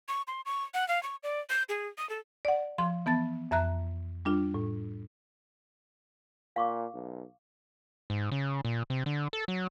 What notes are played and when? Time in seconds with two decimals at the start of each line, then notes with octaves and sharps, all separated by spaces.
0.08 C#6
0.28 C6
0.46 C#6
0.74 F#5
0.88 F5
1.03 C#6
1.23 D5
1.50 G6
1.69 G#4
1.98 D#6
2.10 A4
2.45 D5 F#5
2.78 F3 C6
3.06 E3 B3 A5 A6
3.51 F2 E5 A#5 F#6
4.25 G3 D4 F4
4.54 A2
6.56 A#2 F5 C#6 D6
6.94 B1
8.10 G#2
8.32 C#3
8.65 A#2
8.90 C3
9.06 D3
9.33 A4
9.48 F#3